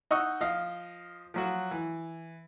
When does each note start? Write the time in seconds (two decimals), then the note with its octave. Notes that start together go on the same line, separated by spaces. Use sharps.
0.11 D#4 D#5 F#5 C#6 E6
0.41 F3 D#5 F5
1.34 F3 F#3 F#4
1.71 E3